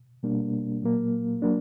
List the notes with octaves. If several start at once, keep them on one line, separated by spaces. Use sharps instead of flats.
B2 G3 A#3 D4
A#2 F#3 A#3
F#3 A#3 D4